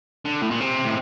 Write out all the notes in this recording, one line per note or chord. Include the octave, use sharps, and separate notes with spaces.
D3
A2
A#2
C3
A2